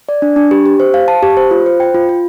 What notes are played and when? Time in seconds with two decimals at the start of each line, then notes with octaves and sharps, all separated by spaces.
0.09 D5
0.22 D4
0.36 D4
0.51 G4
0.66 G4
0.80 C5
0.94 F5
1.08 A5
1.23 G4
1.37 C5
1.51 F4
1.66 C5
1.80 G5
1.94 F4
2.09 F4